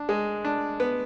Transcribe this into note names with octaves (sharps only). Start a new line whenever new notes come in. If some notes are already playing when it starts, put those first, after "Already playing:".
Already playing: D4
G#3
D4
B3